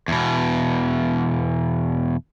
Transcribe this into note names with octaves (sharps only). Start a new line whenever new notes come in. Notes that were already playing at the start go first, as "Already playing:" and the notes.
E2 B2